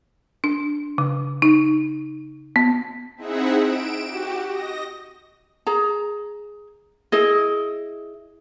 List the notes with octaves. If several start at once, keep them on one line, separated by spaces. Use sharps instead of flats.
D4
C#3
D#4
B3
C4 D#4 E4 G#4 E5 F#5
D7 E7
F#4 G4
D#5 A#6
G#4 A#5
E4 G#4 D#5